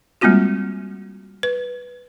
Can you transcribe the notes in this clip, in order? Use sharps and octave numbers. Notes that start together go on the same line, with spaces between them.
G3 G#3 A#3 C4 F4 F#4
B4